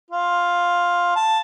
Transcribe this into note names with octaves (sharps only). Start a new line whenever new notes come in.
F4
A5